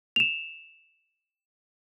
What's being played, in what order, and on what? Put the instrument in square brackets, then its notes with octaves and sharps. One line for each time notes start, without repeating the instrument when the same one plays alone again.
[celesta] E7 F7